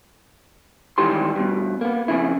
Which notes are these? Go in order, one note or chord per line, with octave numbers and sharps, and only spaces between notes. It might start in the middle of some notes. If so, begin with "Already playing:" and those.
G#2 D#3 E3 G3 G4 C6
G2 B2
A#3 B3
F2 C#3 E4